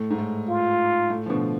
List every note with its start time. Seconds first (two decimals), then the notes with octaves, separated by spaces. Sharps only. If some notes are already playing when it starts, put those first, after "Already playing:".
Already playing: A2
0.10 G#2
0.18 A2
0.49 F4
1.10 A2
1.26 F3
1.30 B2 D3